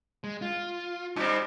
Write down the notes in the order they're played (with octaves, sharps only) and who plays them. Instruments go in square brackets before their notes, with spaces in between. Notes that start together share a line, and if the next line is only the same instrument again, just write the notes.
[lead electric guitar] G#3
F4
[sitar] G2 G3 C4 [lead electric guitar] D#4